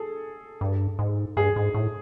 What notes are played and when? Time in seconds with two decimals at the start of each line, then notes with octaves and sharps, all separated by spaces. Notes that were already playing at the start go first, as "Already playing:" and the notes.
Already playing: G#4 A4
0.61 G2
0.99 G#2
1.37 G2 G#4
1.56 G#2
1.74 A2